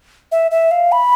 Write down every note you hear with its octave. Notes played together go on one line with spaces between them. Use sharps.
E5
E5
F5
B5